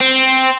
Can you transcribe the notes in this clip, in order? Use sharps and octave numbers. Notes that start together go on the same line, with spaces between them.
C4